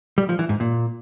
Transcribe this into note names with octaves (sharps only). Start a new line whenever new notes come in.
G3
F3
E3
G#2
A#2